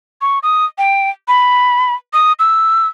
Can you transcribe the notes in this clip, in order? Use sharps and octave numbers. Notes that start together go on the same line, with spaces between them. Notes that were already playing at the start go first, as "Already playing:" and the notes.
C#6
D#6
G5
B5
D#6
E6